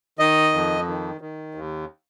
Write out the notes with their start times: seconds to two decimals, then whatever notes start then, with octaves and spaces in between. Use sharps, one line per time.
0.19 D#3 D#5
0.54 F2
0.87 D#3
1.21 D#3
1.55 D#2